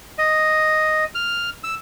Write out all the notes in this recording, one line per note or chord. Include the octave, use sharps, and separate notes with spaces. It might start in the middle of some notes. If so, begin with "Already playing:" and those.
D#5
F6
E6